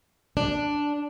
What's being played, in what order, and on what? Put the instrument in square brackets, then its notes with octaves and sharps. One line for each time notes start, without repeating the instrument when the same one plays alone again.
[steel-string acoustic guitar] D4